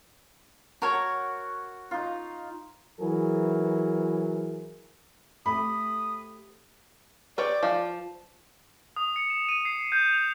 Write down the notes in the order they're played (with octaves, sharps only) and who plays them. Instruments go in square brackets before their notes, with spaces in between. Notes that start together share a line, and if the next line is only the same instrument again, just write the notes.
[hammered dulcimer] F#4 [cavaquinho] A#4 C#5
[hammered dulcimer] D#4 F4
[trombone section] E3 F#3 G#4 A#4
[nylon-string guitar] A3 C4 G4 [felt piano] B5 [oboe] D#6
[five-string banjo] C4 [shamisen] B4 C#5 [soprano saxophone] D5
[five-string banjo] F3
[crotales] D#6
C#7
E7
D#7
C7
G6
F7